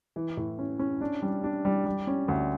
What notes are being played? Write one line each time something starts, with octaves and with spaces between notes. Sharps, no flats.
E3
A2
C#4
C#4
D4
G3
D4
G3
G3
C#4
D2